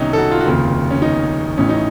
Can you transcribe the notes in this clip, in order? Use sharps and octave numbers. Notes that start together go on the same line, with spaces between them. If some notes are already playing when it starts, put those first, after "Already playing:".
Already playing: C2 C3 D#3 C#4 D#4
A4
F#4
F4
F#4
F1 D#2 C#3 F4
C#4
D#4
A1 A2 C#4
D#4